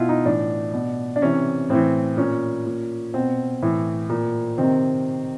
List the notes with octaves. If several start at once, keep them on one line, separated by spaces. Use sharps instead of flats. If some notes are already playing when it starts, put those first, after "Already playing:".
Already playing: B2 E4 F4
D#4
A2 E3 D4
B2
D4
C3 E3 C#4
A2 E3 C4
A#2 C#4
A#2
B2 C4
A2 E3
A#2
C3 D#3 C4